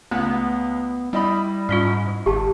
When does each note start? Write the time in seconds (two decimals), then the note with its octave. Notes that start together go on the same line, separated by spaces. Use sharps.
0.11 C#2 A3 B3
1.13 G3 E4 D#5 B5
1.69 G#2 G3 C#4 F4
2.26 G1 G4 A5